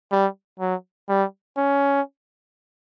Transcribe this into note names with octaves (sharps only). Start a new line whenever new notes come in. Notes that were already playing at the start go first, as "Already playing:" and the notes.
G3
F#3
G3
C#4